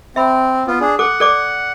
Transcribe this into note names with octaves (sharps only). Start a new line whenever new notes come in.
C4 E5 B5
B3 F4
D4 G#4
A4 F#5 D6
A4 D5 D6